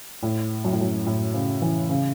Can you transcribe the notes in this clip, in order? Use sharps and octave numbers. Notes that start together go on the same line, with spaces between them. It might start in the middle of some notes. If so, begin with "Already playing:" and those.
A2
F#2
A2
F#2
A2
C#3
E3
C#3